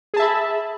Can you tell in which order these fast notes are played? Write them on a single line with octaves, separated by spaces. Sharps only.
G#4 A5 E5 B5